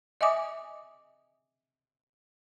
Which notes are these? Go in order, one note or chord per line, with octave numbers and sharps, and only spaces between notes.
D#5 E5 G#5 D6 D#6